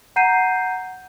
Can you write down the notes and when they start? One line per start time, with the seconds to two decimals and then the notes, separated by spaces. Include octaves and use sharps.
0.16 F#5 A#5 G6 C7 D#7